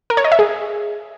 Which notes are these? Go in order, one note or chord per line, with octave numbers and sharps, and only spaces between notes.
A#4
C#5
D#5
E5
G#4